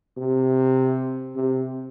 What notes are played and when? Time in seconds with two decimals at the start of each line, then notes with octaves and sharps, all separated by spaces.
0.17 C3
1.35 C3